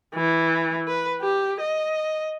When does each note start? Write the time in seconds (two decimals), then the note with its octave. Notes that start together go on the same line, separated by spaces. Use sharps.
0.15 E3
0.87 B4
1.21 G4
1.60 D#5